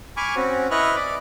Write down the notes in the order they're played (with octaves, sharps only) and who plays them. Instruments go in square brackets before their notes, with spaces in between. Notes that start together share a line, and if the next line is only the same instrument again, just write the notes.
[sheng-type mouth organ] G#5 B5 C#6 D6 F6
C4 C#4 F#4
E4 B4 D#5 C#6 F6 F#6
D5 B5 D6